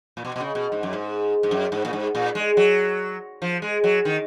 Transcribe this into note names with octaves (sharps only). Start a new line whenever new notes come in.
A#2
B2
B2
C#3
B2
G#2
F#2
G#2
G#2
F#2
G#2
A#2
G#2
A#2
G#3
F#3
F3
G#3
F#3
D#3